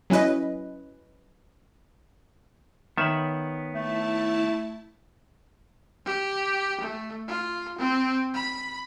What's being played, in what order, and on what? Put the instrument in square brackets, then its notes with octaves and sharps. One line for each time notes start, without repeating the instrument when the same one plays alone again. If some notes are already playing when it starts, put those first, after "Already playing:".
[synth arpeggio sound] F#3 C#4 E4 B4 D#5
[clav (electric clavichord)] D#3 E5 [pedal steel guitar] B3 C#5 B5
[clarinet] A3 [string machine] E4 A5
[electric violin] G4
A3
F4
C4
B5